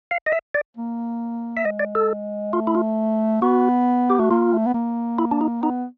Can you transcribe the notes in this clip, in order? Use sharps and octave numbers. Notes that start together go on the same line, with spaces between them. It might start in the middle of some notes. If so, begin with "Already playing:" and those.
F5
D#5
E5
D5
A#3
E5
G#3 D#5
D5
A4
A3 F4
E4
F4
B3 F#4
G4
A3 F#4
A#3 F4
A3
B3
A#3
E4
D4
D#4
B3 D#4